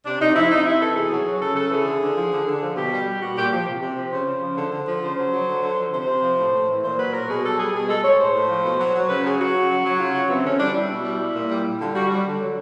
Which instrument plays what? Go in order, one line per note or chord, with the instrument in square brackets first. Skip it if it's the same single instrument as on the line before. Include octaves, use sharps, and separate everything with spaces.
[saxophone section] C3 D4
C3 D#4
F3 E4
C3 D#4
C3 E4
E3 A4
B2 G#4
F#3
F#3
C#3 A4
C#3 A4
E3 G#4
D3
D3
F3
D3
D3
F3
B2 G4
G3
G3
A#2 F#4
A#2 G4
F3 G4
C3
C3
F3
C#3 C5
C#3
F3
D3
D3
F3
C#3 C5
F#3
F#3
D3
D3
F3
C3 C5
C3
F3
A2
A2
E3
A#2 C5
F#3 B4
F#3 A#4
B2 G#4
G3 A4
G3 G#4
B2 G#4
G#3 A4
G#3 C#5
A2 C5
A2
F3
B2
F#3
F#3
C#3 B4
F#3 G#4
F#3 F#4
C#3
F#3
F#3
C#3 F4
C#3 F#4
E3 C4
D3 C#4
G3 D4
G3 E4
B2
G3
G3
A#2
G3
G3
D3 F4
G3 F#4
G3
D3
F#3